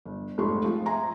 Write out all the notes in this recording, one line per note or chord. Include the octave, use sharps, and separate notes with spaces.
G1
F1 G#2 A3 C6 C#6
F3 G#3 C4
E5 G#5 A#5 C6